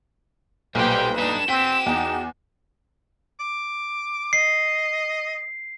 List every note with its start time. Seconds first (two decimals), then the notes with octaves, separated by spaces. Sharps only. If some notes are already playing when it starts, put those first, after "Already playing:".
0.75 B1 A#2 G3 G4 B4 C5 G5
1.18 D4 D#4 B4 E7
1.48 C4 F#4 G5 B6
1.86 E2 D#4
3.40 D6
4.33 D#5 C7